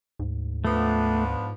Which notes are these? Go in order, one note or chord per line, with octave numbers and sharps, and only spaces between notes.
D2 G#2
F3 A3 B3 D4